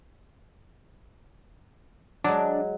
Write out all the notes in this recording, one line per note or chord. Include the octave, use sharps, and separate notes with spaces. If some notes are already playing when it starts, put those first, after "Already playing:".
F#3 G#3 D4